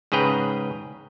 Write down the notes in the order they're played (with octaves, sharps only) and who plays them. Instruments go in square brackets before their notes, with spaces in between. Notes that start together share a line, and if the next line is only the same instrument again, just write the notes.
[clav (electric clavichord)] G#2 C#3 G#4 B4 G5 A#5